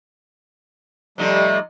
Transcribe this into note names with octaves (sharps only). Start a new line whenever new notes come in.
C3 F3 G3 A3 D#4